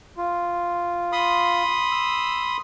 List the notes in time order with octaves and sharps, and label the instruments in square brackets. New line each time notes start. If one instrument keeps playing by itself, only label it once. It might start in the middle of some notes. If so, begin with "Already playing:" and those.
[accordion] F4
[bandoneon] B5 C6 D#6
[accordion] E6